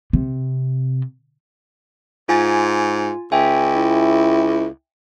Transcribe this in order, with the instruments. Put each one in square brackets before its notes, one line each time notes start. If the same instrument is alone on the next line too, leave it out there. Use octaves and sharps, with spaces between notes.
[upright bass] C3
[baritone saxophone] G#2 [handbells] F4 G#5 A6
[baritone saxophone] C#2 [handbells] E5 G5 G#5
[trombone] E4